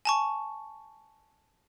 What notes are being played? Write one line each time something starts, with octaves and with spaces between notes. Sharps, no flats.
G#5 A5 C#6